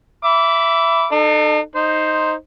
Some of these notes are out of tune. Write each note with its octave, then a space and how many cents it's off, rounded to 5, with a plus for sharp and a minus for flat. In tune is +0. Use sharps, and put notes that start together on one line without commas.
E5 +15 B5 +0 D6 -20
D#4 -45 A4 +0
D#4 +0 C5 +0